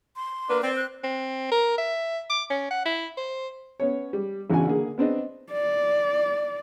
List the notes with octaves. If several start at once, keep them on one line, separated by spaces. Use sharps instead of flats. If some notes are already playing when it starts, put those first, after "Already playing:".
C6
A#3 D4 B4
C4 D5
F#6
C4
A#4
E5
D6
C#4
F#5
E4
C5
B3 C#4 C#5
G3
A1 E2 C#3 D4 F#4 G#5
D3 A#3 G#4
B3 C4 D4 D#5
D5